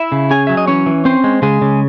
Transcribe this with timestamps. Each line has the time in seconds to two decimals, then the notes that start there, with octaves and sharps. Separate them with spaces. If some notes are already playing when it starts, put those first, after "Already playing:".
Already playing: E4 E5
0.12 C#3
0.31 C#4 G#4 G#5
0.47 F#3 E5
0.57 D#5
0.67 E3 C#4 C#5
0.86 E3
1.05 C4 C#4 C5
1.24 G#3
1.42 C#3 G#3 G#4
1.62 C#3